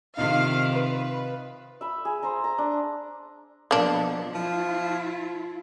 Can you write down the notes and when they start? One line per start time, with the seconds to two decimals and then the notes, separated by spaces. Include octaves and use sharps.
0.17 C3 D#3 D#4 F4 F5
0.73 B4
1.81 E5 B5
2.05 G#4
2.23 C5 E5 A#5
2.44 A#5
2.58 D4
3.71 B2 F3 A#3 B3 D4
4.34 F3 E4 F4